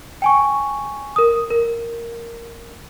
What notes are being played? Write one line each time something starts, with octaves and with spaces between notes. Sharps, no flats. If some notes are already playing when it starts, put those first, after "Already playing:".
G5 G#5 C#6
A#4 D#6
A#4